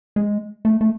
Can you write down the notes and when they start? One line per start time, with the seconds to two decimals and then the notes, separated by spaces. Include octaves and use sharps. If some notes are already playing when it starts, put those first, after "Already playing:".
0.16 G#3
0.65 A3
0.81 A3